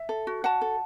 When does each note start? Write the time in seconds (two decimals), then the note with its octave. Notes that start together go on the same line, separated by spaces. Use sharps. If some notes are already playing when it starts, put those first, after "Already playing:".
Already playing: E5
0.09 A4
0.27 F#4
0.44 F#4 F#5 A5
0.62 A4